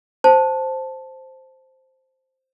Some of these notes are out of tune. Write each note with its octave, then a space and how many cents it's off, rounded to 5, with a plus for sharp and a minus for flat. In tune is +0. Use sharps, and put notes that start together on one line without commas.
C5 +0 A5 +0